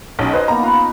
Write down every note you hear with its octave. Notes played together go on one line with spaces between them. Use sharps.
B1 C#4 D#4 D#5
C#4 B4 C5 D#5
A#3 B3 D#4 A#5
F4 B4 F5